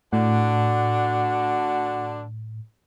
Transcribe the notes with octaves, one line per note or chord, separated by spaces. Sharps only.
A2 D3 D4 F#4